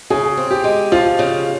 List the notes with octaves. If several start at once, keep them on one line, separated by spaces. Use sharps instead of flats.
C#3 G#4
C4
G4
G#3
F3 F4
C#3